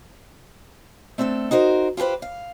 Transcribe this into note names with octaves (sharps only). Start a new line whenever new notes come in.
A3 C4 D4 F#4 A4
D#4 F#4 A#4 C5
F4 G4 G#4 B4 C5
F5